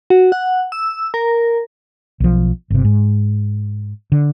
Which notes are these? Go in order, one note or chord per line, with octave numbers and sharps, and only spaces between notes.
F#4
F#5
E6
A#4
B1 F3
G1 C3
G#2
D3